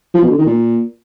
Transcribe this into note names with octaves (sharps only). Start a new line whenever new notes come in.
F3
B2
D3
D#3
A#2